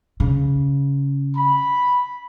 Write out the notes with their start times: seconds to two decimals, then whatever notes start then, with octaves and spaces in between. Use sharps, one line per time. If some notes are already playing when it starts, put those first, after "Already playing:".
0.20 C#3
1.35 B5